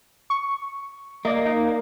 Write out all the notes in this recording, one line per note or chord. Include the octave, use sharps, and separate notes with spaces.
C#6
A#3 D5 D#5
D#4